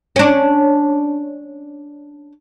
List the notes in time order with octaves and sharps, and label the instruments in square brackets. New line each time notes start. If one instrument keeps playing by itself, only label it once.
[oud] C#4 D4